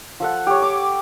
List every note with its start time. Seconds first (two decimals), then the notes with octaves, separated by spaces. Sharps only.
0.20 F3 A4 F#5
0.47 G4 C#5
0.62 D6